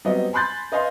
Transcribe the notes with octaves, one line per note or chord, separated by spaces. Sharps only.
F#3 G3 B3 C4 D#5
G#5 B5 C6 F#6 G6 A6
B4 D#5 F5 G#5 C6